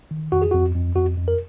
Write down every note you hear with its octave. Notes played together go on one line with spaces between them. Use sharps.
D#3
F2 F#4
G#4
F2 F#4
F2
F2 F#4
F2
A#4